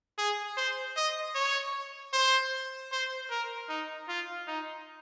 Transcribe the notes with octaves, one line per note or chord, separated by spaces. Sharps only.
G#4
C5
D#5
C#5
C5
C5
A#4
D#4
F4
D#4